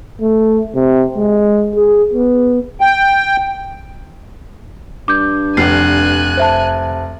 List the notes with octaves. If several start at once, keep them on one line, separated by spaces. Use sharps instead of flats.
A3
C3
G#3
G#4
B3
G5
G2 D6 G6
F1 G#5 F#6 C7
C5 E5 A5